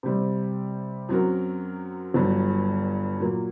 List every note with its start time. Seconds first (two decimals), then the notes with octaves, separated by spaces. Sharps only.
0.03 C3 G3 C4
1.09 F#2 F#3 C4 F#4 A#4
2.14 G1 G2 F#3
3.20 A#2 F#3 A#3